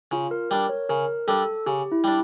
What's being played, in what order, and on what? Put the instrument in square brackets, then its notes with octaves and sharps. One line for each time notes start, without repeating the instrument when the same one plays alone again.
[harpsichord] C#3 [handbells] F4
[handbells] A#4
[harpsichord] G3 D4 [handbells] A#4
[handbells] C#5
[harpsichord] C#3 [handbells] A#4
[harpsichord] G3 D4 [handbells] A4
[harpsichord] C#3 [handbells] G4
[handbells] E4
[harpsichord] G3 D4